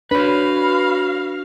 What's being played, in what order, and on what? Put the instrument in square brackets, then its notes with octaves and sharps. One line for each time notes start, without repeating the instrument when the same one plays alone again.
[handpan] D4 [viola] F#4 F5 [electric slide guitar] B4 C#5 [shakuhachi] B5